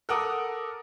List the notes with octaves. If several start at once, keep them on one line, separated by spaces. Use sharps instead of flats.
A4 A#4 F#5 D6 D#6